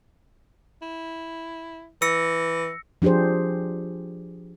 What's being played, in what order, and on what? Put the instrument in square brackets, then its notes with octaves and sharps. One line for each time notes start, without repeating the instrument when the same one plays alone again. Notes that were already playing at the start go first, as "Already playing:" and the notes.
[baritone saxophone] E4
[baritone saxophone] E3 [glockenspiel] E6 A#6 C#7
[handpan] F3 D4 G4 G#4 C5